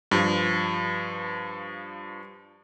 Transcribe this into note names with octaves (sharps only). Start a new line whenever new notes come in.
G2 F3